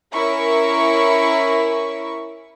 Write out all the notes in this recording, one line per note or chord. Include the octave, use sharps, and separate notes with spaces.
C#4 E4 A#4 C#6